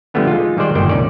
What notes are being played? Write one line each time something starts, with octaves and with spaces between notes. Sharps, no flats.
D3 F3 G3 A3 B3 D4
G#3 D#4 F4
D#3 G3 G#3 C5 D5
G1 A#2 D#3 C5 G5
C2 F2 C#4 D#4 D5